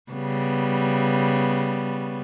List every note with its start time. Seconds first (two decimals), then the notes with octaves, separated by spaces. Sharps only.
0.12 C#3 G3 B3